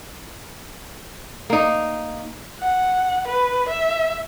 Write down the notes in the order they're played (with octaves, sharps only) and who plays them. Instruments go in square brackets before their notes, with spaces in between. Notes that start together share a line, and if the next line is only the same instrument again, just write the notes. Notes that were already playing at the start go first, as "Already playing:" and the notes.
[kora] A#3 D#4
[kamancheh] F#5
B4
E5